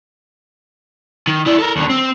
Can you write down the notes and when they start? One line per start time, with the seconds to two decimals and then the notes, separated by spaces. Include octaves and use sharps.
1.27 D#3
1.46 E4 D5
1.58 A4 A#4
1.76 D#2 D3
1.90 C4